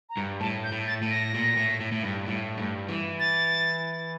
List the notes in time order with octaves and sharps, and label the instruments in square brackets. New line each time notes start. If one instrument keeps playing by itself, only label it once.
[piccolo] A#5
[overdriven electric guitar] G2
[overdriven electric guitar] A2 [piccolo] A5
[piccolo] G6
[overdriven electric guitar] A2
[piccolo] A6
[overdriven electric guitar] A2
[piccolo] A#6
[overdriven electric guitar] A#2
A2
A2
A2
G2
A2
G2
E3
[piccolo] A6